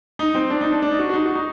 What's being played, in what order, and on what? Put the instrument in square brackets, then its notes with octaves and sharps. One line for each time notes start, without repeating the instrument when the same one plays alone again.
[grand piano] D#4
C4
D4
D#4
D4
D4
D#4
F#4
F#4
D#4
F#4
D#4